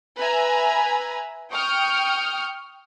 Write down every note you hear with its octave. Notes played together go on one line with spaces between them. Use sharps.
B4 E5 G#5 A#5
G5 C#6 D#6 F6 G6